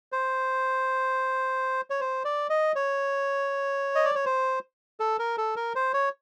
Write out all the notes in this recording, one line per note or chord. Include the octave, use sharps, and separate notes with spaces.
C5
C#5
C5
D5
D#5
C#5
D#5
D5
C#5
C5
A4
A#4
A4
A#4
C5
C#5